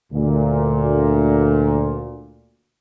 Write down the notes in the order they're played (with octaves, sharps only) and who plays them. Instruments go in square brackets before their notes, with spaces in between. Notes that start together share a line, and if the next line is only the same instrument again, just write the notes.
[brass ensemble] D2 A#2